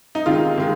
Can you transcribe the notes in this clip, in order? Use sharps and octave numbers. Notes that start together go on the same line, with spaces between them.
D#4
C3 D#3 G#3 F4
C3 D#3 G#3